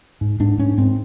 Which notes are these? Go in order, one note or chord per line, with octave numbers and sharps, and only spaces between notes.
G#2
G#2 D4
G#2 C#4
G#2 C4